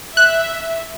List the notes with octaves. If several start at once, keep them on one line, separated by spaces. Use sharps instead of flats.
E5 F#6